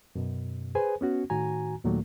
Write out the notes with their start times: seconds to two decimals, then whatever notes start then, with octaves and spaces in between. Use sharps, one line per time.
0.15 F#2 B2
0.75 G#4 B4 C5 G#5
1.01 B3 C#4 F#4
1.30 A2 D#3 F#4 G#5 A#5
1.84 D#2 A#2 D#3 F#3 A3 A#3